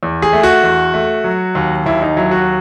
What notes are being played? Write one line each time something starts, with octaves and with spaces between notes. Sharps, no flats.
E2
G#4
A3
F#4
E2
A3
F#3
D#2
D#2 E4
D#4
F#3 E4
F#4